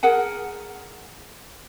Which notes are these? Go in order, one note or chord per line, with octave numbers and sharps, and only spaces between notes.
G#4 A#4 F#5 G#5